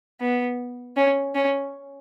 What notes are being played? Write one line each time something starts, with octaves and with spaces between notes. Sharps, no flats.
B3
C#4
C#4